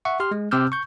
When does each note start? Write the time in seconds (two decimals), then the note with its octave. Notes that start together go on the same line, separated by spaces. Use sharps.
0.05 E5 F#5 C#6
0.20 G4 C6 F6
0.31 G#3
0.51 C3 C4 D6 E6 F6 G6
0.72 C#6 G6